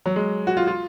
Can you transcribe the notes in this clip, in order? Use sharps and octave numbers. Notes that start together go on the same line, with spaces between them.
F#3
G#3
F#4
F4
F4